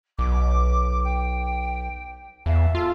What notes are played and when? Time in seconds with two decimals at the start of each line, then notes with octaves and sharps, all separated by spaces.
0.19 B1 D6
1.04 G5
2.46 E2 E5 F5 A5
2.75 F4 A4